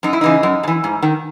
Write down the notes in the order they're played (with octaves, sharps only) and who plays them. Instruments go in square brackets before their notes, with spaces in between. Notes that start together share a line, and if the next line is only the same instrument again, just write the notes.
[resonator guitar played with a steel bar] F#2 D#4
E4
C#3 E3 D#4
F#2
C#3
E3
G#2
D#3